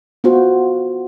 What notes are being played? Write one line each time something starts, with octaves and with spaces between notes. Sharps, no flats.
B3 F4 F#4 C5